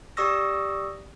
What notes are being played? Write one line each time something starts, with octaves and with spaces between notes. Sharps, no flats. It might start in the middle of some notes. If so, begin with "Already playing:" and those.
G4 D5 C#6 D#6 E6 A#6